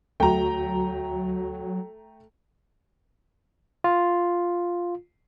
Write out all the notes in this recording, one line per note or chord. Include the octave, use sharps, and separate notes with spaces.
D2 F#3 A3 F#4 G5 A#5
F4